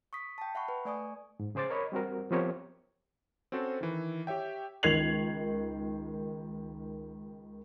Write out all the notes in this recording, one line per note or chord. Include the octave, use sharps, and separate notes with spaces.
C#6 D#6 B6
G5 A5
E5 F#5 B5 C#6
B4
A3 D5 G#5 C#6 D#6
G#2
C#3 G#4 C5 D6 A6
A#4 C#5 D#5 B5
G3 C4 F#4 A#4
F3 B3 C4 G4 A#4 C#5
C4 C#4 F#4 A4 C5
D#3 E3
G4 C#5 E5 G5
C#2 D#3 G#6 C7 F7 F#7